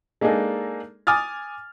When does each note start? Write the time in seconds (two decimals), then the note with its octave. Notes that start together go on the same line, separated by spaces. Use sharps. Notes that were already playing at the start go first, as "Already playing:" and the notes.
0.21 G#3 A#3 D4 D#4 G#4 A4
1.07 G#5 D6 D#6 F6 A6